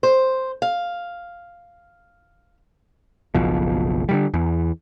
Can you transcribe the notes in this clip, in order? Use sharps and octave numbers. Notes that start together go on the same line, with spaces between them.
C5
F5
F#1 B1 B2 F3
D3 D#3 G3
E2